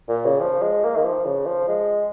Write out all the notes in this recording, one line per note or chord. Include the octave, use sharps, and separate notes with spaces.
A#2
C#3
F3
G#3
A#3
D#3
F3
C#3
F3
G#3